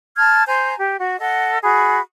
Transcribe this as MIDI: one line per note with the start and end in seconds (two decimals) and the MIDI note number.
0.16 0.46 81
0.16 0.46 89
0.16 0.46 92
0.47 0.74 72
0.47 0.74 80
0.47 0.74 82
0.47 0.74 91
0.77 0.96 67
0.99 1.15 66
1.18 1.58 69
1.18 1.58 75
1.18 1.58 78
1.62 1.99 66
1.62 1.99 68
1.62 1.99 83